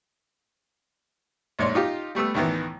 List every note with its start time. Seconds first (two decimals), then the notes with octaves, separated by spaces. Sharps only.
1.59 A#1 G#2 C#5 D5 C6
1.75 D#4 F4 G4
2.15 G3 A3 B3 E6
2.34 D2 A2 D#3 E3 B3